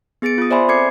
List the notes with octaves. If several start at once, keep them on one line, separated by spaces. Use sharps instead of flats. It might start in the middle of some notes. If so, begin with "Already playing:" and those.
B3 G#4 A6 C#7 D7
F4 D#6
C5 D5 E5 G#5 B5 C6
C4 A4 D6 G#6 C7 C#7